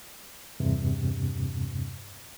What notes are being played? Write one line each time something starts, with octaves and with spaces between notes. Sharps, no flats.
E2 G2 C3